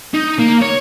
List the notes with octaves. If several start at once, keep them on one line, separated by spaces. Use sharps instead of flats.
D#4
A#3
C#5